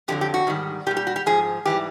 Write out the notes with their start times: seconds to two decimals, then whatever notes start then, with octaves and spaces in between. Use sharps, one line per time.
0.08 F2 D3 F#3 G4
0.21 G4
0.34 F#4
0.47 G#2 D#3 G3
0.86 A#2 G4
0.91 G3
0.97 G4
1.07 F#4
1.16 G4
1.26 G#2 F3 G#4
1.65 G#2 E3 G3 G4